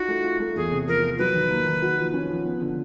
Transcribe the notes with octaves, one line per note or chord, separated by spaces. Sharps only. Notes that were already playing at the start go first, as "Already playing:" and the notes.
Already playing: D#4 F4 F#4
A3
F4
A3
E2 G#4
C3
F3 A#4
F3
F#3 B4
D#3
A#3
D#3
F#4
F3
C#4
F3
B3
D3